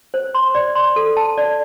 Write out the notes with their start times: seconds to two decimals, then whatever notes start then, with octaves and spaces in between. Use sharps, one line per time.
0.14 C5
0.35 C6
0.55 D5
0.75 C6
0.96 A4
1.17 A5
1.38 D5